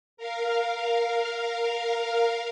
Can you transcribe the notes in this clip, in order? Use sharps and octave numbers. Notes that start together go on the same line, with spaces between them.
A#4 F5